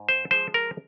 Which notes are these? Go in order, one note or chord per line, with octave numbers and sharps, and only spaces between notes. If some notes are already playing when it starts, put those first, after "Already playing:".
Already playing: G#2
C5
F3 G#3 C5
A#4